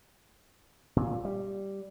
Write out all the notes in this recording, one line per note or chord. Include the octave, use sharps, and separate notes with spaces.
A#2
G3